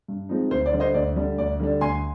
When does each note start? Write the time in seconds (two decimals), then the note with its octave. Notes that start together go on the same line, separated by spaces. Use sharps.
0.08 G2
0.29 F3 G#3 C4 D#4
0.51 D2 C5
0.66 D5
0.72 D3 G3 D4
0.80 C5 D#5
0.94 D2 D5
1.16 D3 G3 D4
1.38 D2 D5
1.60 D3 G3 D4
1.81 D2 G#5 C6